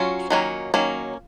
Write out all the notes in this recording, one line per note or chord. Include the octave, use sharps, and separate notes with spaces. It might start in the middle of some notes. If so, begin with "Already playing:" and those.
Already playing: F#3 C#4 F4
D#3 F#3 A#3 C#4
D#3 F#3 A#3 C#4